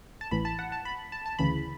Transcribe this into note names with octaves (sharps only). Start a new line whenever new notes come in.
A5
A1 A2 E3 B5
A5
F#5
A5
B5
A5
A5
D2 C#3 E3 B5